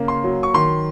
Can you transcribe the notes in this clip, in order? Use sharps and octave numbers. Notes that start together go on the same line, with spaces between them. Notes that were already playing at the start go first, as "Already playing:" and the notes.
Already playing: C#3 A#3
C6
F#3
C#6
D#3 C6